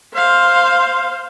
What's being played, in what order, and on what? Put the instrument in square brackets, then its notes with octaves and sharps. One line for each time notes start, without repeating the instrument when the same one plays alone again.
[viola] C5 F5